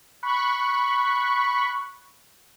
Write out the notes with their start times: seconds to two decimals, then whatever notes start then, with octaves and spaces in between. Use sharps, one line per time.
0.23 B5 C#6 F#6